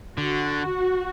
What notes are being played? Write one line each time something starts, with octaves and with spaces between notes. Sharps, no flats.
D3 F#4